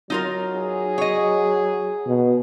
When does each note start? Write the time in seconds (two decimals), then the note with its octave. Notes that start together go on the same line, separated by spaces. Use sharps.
0.10 F#3 D#4 F4 A#4
0.55 G#4
0.98 C#5 D#5
2.07 B2